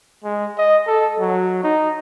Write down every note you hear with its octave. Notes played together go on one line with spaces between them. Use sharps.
G#3
D#5
A4
F#3
D#4